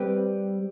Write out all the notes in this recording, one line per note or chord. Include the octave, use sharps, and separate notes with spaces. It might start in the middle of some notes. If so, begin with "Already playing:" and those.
Already playing: G3 C4 G4 B4